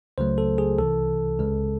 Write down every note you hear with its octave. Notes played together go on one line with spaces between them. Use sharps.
C#2 C#3 F#3 A3 C5
A4
G#4
C2 C3 E3 A4
C#2 C#3 G#3